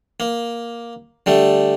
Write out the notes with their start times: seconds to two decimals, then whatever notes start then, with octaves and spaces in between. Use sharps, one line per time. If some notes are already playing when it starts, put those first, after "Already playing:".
0.20 A#3
1.26 D3 G3 A3